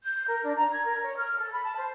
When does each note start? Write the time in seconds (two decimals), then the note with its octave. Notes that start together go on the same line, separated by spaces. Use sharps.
0.03 G6
0.28 A#4
0.43 D4
0.56 A#5
0.71 G#6
0.86 A#4
1.02 C#5
1.17 F6
1.37 A4
1.52 B5
1.63 A5
1.76 C5